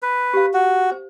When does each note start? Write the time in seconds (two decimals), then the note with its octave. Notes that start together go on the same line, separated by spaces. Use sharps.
0.02 B4
0.33 G4 F5
0.53 F#4
0.92 C5